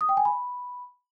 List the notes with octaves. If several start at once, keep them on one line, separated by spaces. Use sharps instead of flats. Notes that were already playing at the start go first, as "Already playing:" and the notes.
D#6
G5
G#5
B5